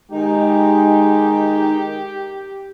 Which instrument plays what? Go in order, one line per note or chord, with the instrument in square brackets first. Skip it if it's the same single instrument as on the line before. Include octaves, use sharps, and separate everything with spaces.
[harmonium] D#3 D#4 [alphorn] G#3 [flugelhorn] G4